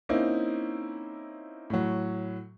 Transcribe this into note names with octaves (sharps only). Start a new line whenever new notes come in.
A#3 C4 C#4 D#4 E4
A2 F#3